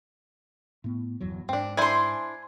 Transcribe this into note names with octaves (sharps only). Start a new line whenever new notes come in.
A2 B3
G1 E2 F#3
G#2 C4 D4
D4 E4 C5 G#5 C6